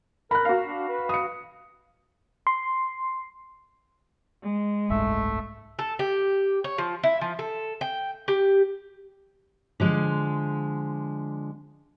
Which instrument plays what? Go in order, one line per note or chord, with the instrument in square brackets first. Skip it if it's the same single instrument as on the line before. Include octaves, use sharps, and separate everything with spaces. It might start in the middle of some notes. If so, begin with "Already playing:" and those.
[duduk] A#4 [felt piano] B5 F#6
[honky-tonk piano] F#4 F5
[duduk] D4
B4
[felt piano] D#6 C#7
[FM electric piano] C6
[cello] G#3
[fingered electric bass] F#1 C2 G#2 [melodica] A3 E5
[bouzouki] A4
G4
C#5
F3
E4
F3
A4
G5
G4
[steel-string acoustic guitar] D3 F3 G#3